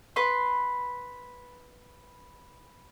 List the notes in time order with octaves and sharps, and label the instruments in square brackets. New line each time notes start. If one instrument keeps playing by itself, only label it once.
[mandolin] B4 B5 C6